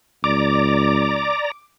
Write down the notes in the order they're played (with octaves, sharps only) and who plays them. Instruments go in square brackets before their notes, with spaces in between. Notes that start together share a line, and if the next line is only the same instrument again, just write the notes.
[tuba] C#2 [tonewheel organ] D5 A#5 [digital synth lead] D6